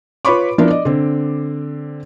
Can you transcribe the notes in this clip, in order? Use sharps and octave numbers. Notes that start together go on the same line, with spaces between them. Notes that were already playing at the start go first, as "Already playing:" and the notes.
F4 B4 C#5 B5 C#6 D6
F3 B3 D4 E4 A#4
D5 D#5
D3 C4